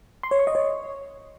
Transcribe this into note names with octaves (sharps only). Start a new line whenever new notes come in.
C6
C#5
C#6
D#5
C#5